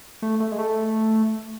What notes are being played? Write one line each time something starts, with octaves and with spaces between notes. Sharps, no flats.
A3
A3
G#3
A3